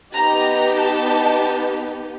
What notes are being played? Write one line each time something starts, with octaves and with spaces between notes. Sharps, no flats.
B3 D#4 G4 A#5
A5